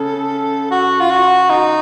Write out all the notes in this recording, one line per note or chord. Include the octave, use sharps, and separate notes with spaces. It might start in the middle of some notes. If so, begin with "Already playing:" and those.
Already playing: C#3 A4
F#4
F4
F#4
D#4